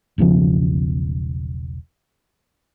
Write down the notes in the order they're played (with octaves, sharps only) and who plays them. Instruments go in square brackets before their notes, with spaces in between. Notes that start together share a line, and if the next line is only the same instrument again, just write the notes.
[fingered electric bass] E1 B1 C#3 F3